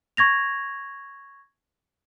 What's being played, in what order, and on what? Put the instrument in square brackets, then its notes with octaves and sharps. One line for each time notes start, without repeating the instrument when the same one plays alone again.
[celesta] C#6 G#6 A#6 F7